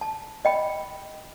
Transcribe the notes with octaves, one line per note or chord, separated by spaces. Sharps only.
A5
D#5 G5 B5